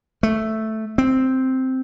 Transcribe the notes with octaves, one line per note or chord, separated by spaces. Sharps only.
A3
C4